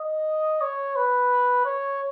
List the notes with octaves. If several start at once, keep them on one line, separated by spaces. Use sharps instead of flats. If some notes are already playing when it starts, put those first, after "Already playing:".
Already playing: D#5
C#5
B4
C#5